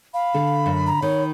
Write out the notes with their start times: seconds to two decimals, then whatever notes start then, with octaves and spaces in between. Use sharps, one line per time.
0.14 F5 B5
0.35 D3 A4
0.66 F#2
0.87 A#5
1.02 D#3 C#5